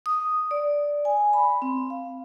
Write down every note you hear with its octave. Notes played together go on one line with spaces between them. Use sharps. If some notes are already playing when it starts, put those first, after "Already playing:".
D#6
D5
G#5
B5
C4
F5